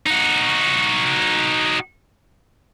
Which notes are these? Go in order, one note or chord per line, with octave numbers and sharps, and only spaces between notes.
D#4 F#4